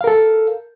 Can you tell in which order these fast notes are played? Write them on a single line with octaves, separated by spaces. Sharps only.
F5 A#4 A4